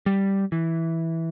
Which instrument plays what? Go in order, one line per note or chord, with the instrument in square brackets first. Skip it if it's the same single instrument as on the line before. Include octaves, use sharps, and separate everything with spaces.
[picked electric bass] G3
E3